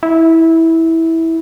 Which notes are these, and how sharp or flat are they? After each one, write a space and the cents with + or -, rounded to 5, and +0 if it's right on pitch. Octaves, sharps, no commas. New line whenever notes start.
E4 -15